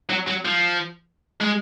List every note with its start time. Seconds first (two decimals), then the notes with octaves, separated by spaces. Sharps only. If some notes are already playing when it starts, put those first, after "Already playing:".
0.10 F#3
0.28 F#3
0.45 F3
1.41 G#3